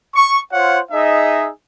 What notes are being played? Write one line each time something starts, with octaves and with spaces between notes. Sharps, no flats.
C#6
F4 C5 C#5 F5 F#5
D#4 G#4 D#5 E5